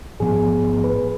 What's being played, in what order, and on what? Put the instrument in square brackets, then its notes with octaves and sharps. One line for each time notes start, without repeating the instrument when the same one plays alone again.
[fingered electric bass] A1 G#2 F3 B3 [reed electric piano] G#4
[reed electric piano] B4